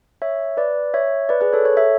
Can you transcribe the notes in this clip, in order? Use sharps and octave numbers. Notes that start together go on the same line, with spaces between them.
C#5 E5
B4 D5
C#5 E5
B4 D5
G#4 B4
A4 C#5
A4 C#5
C#5 E5